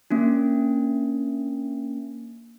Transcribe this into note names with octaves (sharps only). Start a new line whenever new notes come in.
A#3 C#4 D4